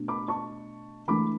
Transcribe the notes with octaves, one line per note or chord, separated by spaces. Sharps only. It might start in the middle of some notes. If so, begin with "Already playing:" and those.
Already playing: B2 A3 D4
B5 D6
A5 C#6
E3 A3 D4 B5 D6